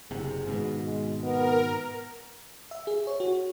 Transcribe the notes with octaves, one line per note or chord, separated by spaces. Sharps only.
F#1 C3 G#4
G#1 G#2 B2
G#3
B3 A#4
E5
G#4
C#5
F#4